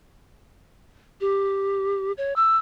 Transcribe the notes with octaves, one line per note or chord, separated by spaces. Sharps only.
G4
C#5
E6